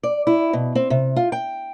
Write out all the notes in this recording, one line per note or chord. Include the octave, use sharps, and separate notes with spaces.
D5
E4
B2
C4
C3
F4
G5